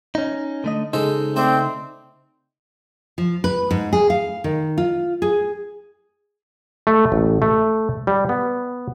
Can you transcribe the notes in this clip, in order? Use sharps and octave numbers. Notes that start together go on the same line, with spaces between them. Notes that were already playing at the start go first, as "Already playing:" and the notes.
C#4 D#4
D3 A3 D#5
C#3 G#3 D#4 A4 C5
A3 C4 C5 D5
F3
B4
G#2
G#4
F5
D#3
F4
G#4
A3
A1
A3
G3
B3